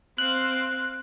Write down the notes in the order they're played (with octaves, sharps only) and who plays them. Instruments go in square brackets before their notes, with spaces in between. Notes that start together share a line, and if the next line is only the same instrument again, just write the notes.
[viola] C4 F5 [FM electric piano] F#6